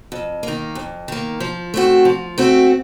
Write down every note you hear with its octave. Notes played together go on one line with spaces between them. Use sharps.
F2
D#3 A#3
F2
D#3 A#3
F3
A3 C4 F#4
F3
A3 C4 F#4